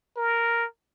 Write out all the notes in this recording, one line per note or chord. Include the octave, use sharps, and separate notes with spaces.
A#4